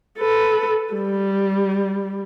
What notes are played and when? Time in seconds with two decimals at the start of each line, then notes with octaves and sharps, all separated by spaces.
0.18 A4 B4
0.93 G3